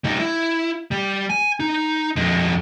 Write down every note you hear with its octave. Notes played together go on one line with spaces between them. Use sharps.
G3 D#4
E4
G3
G#5
D#4
F2 G#3